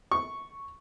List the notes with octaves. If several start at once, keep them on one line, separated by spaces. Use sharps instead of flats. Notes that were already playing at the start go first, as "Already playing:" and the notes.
C#6